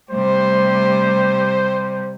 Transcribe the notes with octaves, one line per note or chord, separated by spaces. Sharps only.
C3 G3 A3 C5